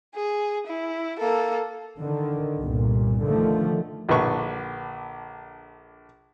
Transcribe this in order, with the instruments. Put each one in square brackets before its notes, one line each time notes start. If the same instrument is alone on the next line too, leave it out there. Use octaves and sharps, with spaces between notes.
[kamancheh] G#4
E4
A#3 A4
[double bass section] D3 D#3
G1 C2 A#2
D3 D#3 F3 A3
[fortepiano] A#1 D3 B4 C#6